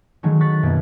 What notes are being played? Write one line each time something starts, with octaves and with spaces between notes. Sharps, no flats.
D#3 F#3 G#3 A3
C#6 F#6 A6 B6 C#7
F#2 B2 G3 A#3